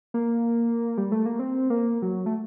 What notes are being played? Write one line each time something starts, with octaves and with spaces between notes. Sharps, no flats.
A#3
G3
A3
A#3
C4
A#3
F#3
A3